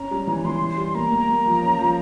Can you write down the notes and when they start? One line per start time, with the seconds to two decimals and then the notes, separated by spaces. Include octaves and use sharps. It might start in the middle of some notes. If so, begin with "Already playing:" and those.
Already playing: C#4 A#5
0.11 G3
0.27 E3
0.45 E3 C6
0.62 E3
0.70 C6
0.78 G3
0.95 A#3 A#5
1.12 A#3
1.29 A#3
1.46 F3
1.62 C#4
1.79 F3